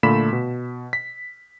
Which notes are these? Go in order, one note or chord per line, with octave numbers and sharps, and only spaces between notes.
A#2 D3 A3 B5 B6 E7
B2
B6